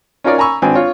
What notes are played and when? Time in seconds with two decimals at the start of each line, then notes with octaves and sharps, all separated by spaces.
0.24 C#4 D#4 F4 A#4 C#5 D5
0.38 G#5 A#5 B5 C#6 E6
0.62 G#1 C4 D4 B4 G#5
0.75 F4 C#5